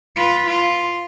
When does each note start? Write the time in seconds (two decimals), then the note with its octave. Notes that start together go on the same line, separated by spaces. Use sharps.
0.16 F4 B4
0.47 F4